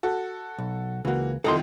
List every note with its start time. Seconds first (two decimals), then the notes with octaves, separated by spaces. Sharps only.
0.03 F#4 A4
0.58 B1
1.05 C#2 E3 A#3 F#4
1.44 C2 F2 D#3 A4 D#5 C6